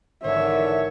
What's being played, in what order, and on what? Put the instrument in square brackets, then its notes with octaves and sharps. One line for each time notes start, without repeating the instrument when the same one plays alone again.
[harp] G#1 [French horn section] D3 E3 [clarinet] C#5 [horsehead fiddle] E5